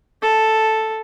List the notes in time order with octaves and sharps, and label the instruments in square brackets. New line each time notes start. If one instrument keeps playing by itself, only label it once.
[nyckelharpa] A4